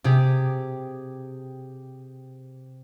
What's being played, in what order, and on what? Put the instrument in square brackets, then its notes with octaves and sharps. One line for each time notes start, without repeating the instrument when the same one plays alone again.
[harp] C3 G4 G#4